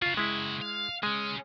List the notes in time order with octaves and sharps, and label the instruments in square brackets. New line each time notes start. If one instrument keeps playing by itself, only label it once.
[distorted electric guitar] C#3 F#4 [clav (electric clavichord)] F4 F5
[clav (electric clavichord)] G#3 E4
[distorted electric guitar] F5
[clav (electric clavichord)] G#3 [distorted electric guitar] C#4 G#4